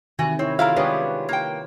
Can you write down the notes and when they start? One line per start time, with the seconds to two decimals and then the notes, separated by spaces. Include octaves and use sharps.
0.19 C3 D#3 E3 F#4 G#5
0.39 C4 E4 C#5
0.59 F#3 A3 E4 F4 A#4 F5
0.76 G#3 B3 D4 G4 B4 C#5
1.29 A#3 G5